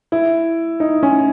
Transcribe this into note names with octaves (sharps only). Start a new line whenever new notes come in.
E4
D#4
C#4